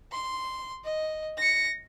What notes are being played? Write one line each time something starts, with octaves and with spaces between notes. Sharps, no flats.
C6
D#5
A#6 C#7